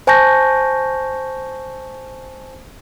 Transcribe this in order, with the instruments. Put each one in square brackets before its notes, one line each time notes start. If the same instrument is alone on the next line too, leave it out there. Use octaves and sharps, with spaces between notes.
[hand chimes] C5 G#5 A5 C#6 G6 A#6